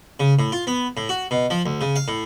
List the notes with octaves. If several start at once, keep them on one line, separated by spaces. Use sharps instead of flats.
C#3
A2
F4
B3
A2
F#4
B2
F3
D2
C#3
F5
A2